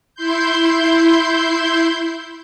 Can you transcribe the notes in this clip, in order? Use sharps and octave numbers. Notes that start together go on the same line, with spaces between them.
E4 C6 G6